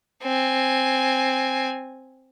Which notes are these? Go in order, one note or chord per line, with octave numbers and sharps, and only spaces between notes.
C4 G#5